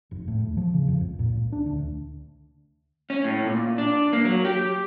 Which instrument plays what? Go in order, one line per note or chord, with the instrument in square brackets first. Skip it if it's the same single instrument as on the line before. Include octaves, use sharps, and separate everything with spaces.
[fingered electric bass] F1
A2
D#1
F3
C#3
F2
C#2
A#2
C#2
D4
D2
[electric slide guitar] C#4
A2
A#2
D4
A#3
F#3
G4